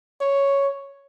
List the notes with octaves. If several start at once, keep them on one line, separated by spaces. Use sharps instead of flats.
C#5